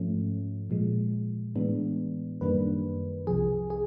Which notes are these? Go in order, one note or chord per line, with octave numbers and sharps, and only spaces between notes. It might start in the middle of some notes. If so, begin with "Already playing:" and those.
Already playing: G#2 F3 A3 C#4
A#2 F3 G#3
A2 E3 G#3 B3 D4
F#2 D#3 G3 A#3 D4 B4
C2 C3 F3 G#4
G#4